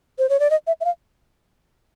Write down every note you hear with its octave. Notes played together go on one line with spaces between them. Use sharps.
C5
C#5
D5
D#5
E5
E5
F5